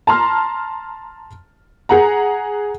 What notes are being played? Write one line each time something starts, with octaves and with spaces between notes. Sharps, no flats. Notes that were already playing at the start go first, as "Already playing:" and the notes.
A5 A#5 C6 F6
G#4 F#5 A#5